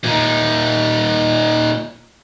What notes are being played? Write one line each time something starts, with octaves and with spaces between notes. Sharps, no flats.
A#2 D#4